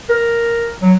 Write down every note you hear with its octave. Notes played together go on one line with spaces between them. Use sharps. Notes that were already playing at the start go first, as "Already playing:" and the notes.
A#4
F#3